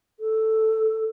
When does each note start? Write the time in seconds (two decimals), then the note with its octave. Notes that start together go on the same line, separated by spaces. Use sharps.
0.20 A4